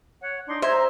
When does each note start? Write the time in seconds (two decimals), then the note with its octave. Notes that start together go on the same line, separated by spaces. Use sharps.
0.21 C#5 F#5
0.48 D4 D#4 C6
0.62 C5 E5 A#5 G#6
0.75 A#5